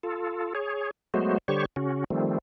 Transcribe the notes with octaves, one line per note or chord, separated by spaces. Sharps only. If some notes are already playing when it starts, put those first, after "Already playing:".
F4 A4
G#4 C#5
F#3 G#3 A3 B3 F#4 C5
D3 G3 G4 C5 C#5 C#6
C#3 C#4 F#4
D#3 F3 G3 A3 C4